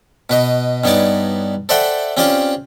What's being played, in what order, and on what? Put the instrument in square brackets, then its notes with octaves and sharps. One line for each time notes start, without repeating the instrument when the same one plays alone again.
[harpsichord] B2 B4 D#5
G2 B3 D#4 C#5 D5 D6
A4 C5 D5 E5 F#5 G5
C4 C#4 F4 G4 C5 D5